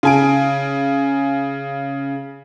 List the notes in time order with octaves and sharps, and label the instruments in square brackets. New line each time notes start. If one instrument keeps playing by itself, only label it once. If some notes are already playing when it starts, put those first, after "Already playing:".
[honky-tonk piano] C#3 G#5 D7